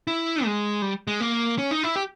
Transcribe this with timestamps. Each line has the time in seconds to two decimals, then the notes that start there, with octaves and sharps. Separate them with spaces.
0.07 E4
0.45 G#3
0.82 G3
1.07 G#3
1.21 A#3
1.58 C#4
1.71 D#4
1.83 E4
1.96 G4